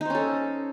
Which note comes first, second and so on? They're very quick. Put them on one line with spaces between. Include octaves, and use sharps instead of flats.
D#4 C5 C#4 A4